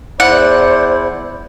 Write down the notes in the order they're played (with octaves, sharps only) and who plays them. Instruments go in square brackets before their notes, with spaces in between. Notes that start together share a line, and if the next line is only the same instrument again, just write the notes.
[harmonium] E2 E4 [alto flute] C5 [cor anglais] D5 [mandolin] F#5